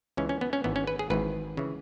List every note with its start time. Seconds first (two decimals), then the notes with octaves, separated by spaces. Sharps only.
0.17 C#2 C#3 E3 C#4
0.29 C#4
0.41 B3
0.53 C#4
0.64 G#1 G#2 E3 B3
0.76 C#4
0.87 B4
0.99 G#4
1.10 G#1 G#2 E3 B4
1.57 C#3 E3